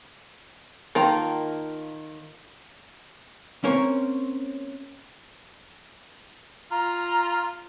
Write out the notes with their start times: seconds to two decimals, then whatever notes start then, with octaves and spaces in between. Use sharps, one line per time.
0.95 D#3 A#3 F4 A5 A#5
3.64 A#3 C4 C#4 A#4 C5 C#5
6.71 F4 A#5